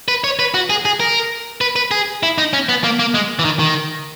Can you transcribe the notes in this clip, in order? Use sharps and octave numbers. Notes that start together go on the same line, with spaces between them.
B4
C#5
B4
F#4
G#4
G#4
A#4
B4
B4
G#4
E4
D#4
C#4
B3
A#3
A#3
G#3
E3
D#3
D#3